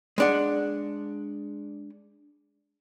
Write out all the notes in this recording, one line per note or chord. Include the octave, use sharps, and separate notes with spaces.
G#3 D4 F#5